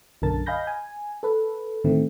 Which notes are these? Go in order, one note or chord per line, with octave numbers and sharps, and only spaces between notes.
B1 F#2 D3 A#4 A5 A6
D#5 F5 G#5 B5 G6 A#6
G#5
A4 B4
A2 D3 D#3 A3 C4